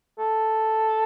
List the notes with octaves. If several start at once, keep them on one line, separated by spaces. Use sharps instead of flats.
A4